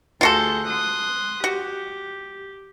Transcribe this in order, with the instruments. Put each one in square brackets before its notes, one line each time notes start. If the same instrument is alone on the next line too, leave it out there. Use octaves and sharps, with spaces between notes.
[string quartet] D2 G#4 G6 [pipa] F4 F#4 A4
[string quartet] C6 D#6 F#6
[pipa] F#4 [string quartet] G4